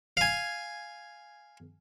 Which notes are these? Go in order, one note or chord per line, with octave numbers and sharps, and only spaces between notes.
F5 G#5